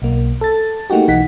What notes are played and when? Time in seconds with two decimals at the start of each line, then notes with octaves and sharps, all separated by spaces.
0.02 B1 A#3
0.41 A4 A6
0.90 A3 A#3 D#4 F#4 G4
1.08 B1 E3 D#4 F#5 B6